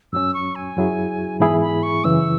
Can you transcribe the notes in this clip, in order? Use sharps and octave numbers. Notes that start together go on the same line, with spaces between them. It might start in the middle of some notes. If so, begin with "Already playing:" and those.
F#2 F#3 C#4 E6
C#6
G#5
F#2 F#3 E4 G#4
G#2 E3 B3 E4 G#4 B5
B5
C#6
F#2 C#3 E3 E6